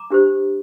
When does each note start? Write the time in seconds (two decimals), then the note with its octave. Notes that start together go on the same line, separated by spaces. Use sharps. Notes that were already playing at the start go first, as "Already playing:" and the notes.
Already playing: A#5 D6
0.10 D4 G4 C5